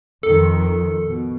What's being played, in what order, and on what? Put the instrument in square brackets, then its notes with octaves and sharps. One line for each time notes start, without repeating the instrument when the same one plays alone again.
[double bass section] F2 D#3 [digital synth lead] A4
[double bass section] B2